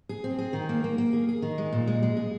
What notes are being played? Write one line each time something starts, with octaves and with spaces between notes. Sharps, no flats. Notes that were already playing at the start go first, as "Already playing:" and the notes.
G#4
C4
G#4
D#3
A#3
A#3
A#3
G#4
G#4
D#3
G#3
A#2
G#3
G#3
G#4